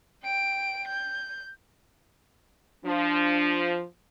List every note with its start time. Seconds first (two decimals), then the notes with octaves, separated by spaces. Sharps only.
0.23 G5 D7
0.88 G6
2.85 F3 D4